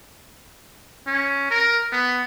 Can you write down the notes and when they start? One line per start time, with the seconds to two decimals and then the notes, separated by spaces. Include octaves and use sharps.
1.07 C#4
1.50 A#4
1.92 B3